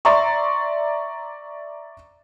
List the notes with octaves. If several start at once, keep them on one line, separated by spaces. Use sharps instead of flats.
D5 E5 A#5 C6 C#6